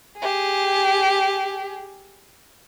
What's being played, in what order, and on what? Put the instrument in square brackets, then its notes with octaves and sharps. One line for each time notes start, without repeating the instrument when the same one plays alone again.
[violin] G4 G#4